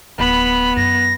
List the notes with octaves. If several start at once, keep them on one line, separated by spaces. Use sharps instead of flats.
D1 B3 B5
F#2 A#6